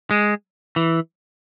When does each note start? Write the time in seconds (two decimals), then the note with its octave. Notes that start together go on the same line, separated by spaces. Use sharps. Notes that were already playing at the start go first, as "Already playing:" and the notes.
0.11 G#3
0.76 E3